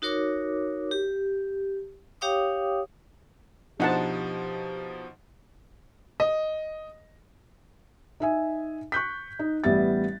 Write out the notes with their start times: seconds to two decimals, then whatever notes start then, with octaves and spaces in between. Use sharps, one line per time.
0.02 D#4 F#4 A#4 C#5 D6
0.91 G4
2.21 G4 C#5 F5 G5 D6 D#6
3.80 B2 F3 D4 D#4 G4 C5 F#5 A5
6.20 D#5
8.20 D#4 E5 G#5
8.92 C#6 F#6 G6 B6
9.39 D#4
9.64 A1 G3 B3 E5 A6